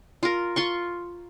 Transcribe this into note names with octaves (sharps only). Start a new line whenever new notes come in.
F4 A#4
F4 C6 C#6